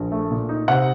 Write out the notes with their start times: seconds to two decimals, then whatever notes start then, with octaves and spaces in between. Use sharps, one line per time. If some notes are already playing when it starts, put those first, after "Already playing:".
Already playing: A#1
0.12 A3
0.31 A#2
0.49 D#4
0.68 C3 F#5